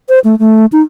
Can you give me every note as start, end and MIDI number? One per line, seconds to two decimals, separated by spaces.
0.09 0.19 72
0.24 0.35 57
0.39 0.66 57
0.72 0.81 63